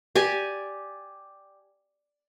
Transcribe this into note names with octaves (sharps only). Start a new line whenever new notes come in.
G4 D5 G#5